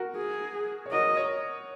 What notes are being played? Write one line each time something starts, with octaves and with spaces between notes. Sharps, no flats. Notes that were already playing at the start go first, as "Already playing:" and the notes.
Already playing: F#4 A#4
G#4
C#5
F#4 A#4 D#5
C#5
A#4